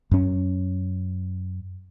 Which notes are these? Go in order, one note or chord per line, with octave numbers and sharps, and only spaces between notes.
F#2 C#4